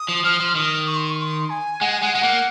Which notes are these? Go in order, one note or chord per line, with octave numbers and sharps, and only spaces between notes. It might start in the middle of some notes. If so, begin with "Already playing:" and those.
Already playing: D#6
F3
F3 F6
F3
D#3 D#6
C#6
C6
C#6
C6
G#5
G#3 F#5
G#5
G#3 F#5
G#3 F#5
A#3